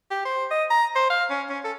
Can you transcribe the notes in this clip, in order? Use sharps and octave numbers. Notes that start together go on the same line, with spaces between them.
G4
C5
D#5
A#5
C5
F5
C#4
C#4
A4